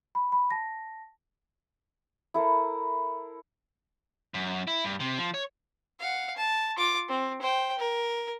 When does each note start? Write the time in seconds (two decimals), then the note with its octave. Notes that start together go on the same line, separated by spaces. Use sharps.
0.15 B5
0.32 B5
0.51 A5 A#6
2.34 E4 A4 A#4 C5
4.34 F#2
4.67 E4
4.85 G2
5.00 C3
5.18 F3
5.34 C#5
6.00 F5 F#5
6.37 A5
6.78 F4 D6
7.08 C4
7.42 C5 G5
7.79 A#4